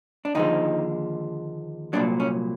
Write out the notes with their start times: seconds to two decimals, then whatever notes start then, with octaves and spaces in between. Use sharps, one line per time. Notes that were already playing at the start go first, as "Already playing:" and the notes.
0.25 D4
0.35 D#2 D3 F3 G#3 D#4
1.93 C2 A#2 F#3 D4
2.20 C#4